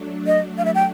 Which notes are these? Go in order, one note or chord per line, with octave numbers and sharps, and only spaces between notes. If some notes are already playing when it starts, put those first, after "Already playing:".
Already playing: F#3 A3 D4
D#5
F5
E5
G5